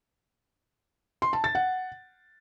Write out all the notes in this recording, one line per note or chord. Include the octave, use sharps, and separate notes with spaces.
C6
A5
A6
F#5